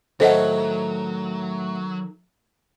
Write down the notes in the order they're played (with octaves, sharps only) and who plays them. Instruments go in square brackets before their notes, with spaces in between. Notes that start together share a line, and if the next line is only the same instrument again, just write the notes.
[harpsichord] A2 A3 [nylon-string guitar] D#3 A4 [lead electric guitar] F#3 [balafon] C5 D#5 F#5